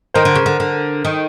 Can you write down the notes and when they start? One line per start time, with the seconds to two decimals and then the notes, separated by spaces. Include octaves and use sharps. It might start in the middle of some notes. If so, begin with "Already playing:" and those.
0.14 D#3 A#4 C5
0.25 D3
0.35 C#3
0.46 D3
0.60 D3
1.05 D#3